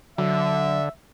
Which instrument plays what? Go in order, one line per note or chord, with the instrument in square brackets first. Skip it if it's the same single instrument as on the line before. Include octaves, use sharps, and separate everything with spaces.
[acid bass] D3 [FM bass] F#3 [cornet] E5